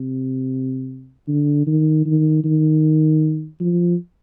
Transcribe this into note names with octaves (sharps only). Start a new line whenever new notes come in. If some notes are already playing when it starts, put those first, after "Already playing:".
Already playing: C3
D3
D#3
D#3
D#3
F3